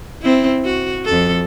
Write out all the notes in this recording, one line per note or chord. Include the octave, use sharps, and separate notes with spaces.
C4 E4
F#4
F2 A4